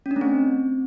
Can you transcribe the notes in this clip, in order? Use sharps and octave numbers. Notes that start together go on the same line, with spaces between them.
C#4
D4
A3
C4